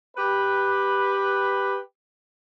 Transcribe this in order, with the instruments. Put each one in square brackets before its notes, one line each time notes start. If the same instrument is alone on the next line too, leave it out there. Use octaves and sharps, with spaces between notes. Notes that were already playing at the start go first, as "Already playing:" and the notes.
[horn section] G4 B4